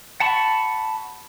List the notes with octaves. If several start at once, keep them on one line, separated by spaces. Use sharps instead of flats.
F#5 A5 B5 C#6